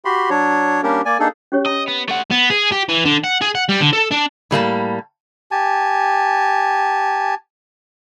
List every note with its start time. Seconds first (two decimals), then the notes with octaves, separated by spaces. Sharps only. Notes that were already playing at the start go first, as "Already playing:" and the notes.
0.05 F#4 G4 B5 C6
0.30 F#3 D4 C#5
0.83 G3 A#3 C#4 D4 G4 A#4
1.05 A#3 D5 G#5
1.20 A#3 D4 D#4 G#4 A4
1.52 C#4 G4 C#5
1.66 D#5 A#5
1.88 B3
2.09 A3 F#5
2.31 B3
2.50 G#4
2.72 G4
2.89 E3
3.06 D3
3.24 F#5
3.42 G#4
3.55 F#5
3.69 G3
3.80 D3
3.93 A4
4.11 D4
4.51 A2 G3 A#3 A5
5.51 G4 G#5 A5